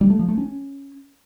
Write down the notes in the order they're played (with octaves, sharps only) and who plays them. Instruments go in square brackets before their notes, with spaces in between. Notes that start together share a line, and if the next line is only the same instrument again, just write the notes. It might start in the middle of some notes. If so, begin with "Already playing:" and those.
[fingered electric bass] G3
A3
F3
A3
C#4